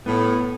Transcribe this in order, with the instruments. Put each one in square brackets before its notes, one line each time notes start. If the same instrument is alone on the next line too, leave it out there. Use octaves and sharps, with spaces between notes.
[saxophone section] A2 [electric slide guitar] B3